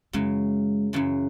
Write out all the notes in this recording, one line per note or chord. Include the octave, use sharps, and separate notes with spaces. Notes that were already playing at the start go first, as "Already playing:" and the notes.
F#2 C#3 E3 G#3
F#2 C#3 E3